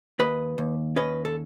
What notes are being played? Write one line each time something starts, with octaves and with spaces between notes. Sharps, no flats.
D#2 B4 D#5
D#2
C#4 B4 D#5
A4